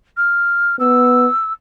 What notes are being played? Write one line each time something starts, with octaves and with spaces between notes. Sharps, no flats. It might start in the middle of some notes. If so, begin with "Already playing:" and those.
F6
B3 E6